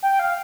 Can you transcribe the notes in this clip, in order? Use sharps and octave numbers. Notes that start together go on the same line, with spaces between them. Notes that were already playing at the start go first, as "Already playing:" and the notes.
G5
F5